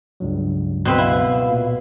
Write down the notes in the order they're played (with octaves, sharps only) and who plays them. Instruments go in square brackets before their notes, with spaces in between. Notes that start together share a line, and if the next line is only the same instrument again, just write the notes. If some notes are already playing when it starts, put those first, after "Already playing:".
[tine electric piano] C#2 G2 F#3
[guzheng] B2 C4 B4
[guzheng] E4 [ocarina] F5
[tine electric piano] A#2